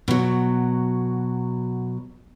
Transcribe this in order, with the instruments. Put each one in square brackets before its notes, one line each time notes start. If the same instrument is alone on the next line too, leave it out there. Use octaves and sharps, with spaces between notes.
[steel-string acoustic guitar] B2 F#3